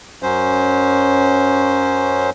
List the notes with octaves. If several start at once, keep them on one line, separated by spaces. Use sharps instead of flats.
F#2 F#3 C#4 C5